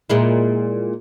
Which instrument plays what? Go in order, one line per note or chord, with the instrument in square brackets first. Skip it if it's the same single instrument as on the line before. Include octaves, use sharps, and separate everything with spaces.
[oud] A#2 G#3 E4